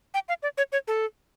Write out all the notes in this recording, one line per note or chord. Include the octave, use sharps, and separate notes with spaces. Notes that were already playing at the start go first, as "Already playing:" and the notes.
G5
F5
D5
C#5
C#5
A4